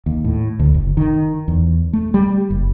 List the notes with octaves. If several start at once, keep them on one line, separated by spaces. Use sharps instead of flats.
D#2
A2
D2
F#1
D#3
E2
A3
G3
F#1